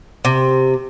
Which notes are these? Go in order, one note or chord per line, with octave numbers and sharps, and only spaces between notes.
C3